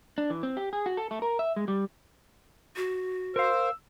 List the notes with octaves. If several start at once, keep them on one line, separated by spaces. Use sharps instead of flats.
D4
E3
C4
G4
G#4
F#4
A4
A3
A#4
E5
G#3
G3
F#4
A#4 C5 F5 E6